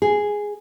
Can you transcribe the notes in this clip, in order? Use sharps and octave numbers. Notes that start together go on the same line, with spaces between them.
G#4